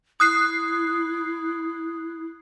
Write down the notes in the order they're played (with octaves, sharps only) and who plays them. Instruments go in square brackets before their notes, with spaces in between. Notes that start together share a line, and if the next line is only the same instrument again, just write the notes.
[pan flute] E4 [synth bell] D#6 F#6 C7